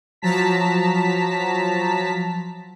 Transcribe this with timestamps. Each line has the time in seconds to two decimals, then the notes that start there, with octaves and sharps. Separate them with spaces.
0.22 F3 F#3 A5 A#5 B6